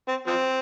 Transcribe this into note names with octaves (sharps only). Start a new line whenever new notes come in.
C4
F3 C4